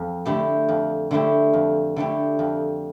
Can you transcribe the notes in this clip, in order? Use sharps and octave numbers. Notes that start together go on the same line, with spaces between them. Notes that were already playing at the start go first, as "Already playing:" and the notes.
Already playing: F2
D3 A3 E4 G4
F2
D3 A3 E4 G4
F2
D3 A3 E4 G4
F2